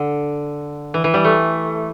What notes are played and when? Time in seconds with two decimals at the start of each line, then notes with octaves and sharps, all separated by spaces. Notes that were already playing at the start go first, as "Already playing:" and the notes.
Already playing: D3
0.94 E3
1.04 E3
1.14 G3
1.24 A3